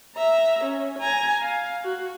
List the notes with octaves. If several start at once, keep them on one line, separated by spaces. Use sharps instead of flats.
E5 A#5
C#4
G#5 A#5
F5
F#4